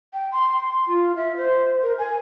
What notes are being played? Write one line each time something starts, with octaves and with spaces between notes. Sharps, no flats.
G5
C6
F4
E5
C5
A#4
G#5